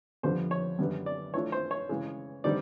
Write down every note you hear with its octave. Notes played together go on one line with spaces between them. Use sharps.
F2 D3 G3 B3 C5
C#5
F#2 D3 G3 B3
D5
E3 A3 D4 F4 C#5
C5
C#5
C#3 E3 G#3
D3 G3 C4 D#4 D5